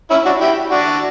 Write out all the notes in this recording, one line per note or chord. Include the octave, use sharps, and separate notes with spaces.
C#4 E4
D4 F#4
E4 G4
D4 F#4